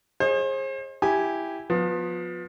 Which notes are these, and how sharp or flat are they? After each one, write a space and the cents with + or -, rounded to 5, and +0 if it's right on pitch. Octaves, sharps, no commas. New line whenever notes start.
G#4 +0 C5 +40 D#5 -5
E4 +0 G4 +0 G#5 +0
F3 +30 B3 +0